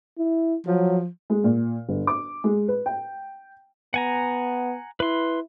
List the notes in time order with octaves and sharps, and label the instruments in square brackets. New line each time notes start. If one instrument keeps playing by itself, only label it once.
[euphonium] E4
[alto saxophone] F3 [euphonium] F#3
[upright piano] G#3
A#2
G1
D6
G#3
B4
G5
[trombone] B3 [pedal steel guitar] F#5 G#5 A#5
[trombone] E4 [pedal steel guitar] B4 C6